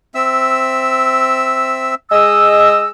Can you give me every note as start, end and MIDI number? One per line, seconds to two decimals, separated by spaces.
0.15 1.95 60
0.15 1.95 76
0.15 1.95 88
2.11 2.91 56
2.11 2.91 75
2.11 2.91 88